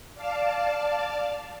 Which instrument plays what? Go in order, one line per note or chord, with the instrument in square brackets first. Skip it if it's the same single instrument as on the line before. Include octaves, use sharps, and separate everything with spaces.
[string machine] D5 F5 A5